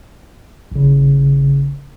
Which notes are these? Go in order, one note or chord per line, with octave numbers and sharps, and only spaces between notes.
G#1 C#3